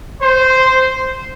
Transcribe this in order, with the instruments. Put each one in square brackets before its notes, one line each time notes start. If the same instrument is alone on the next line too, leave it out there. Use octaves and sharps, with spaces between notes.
[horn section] C5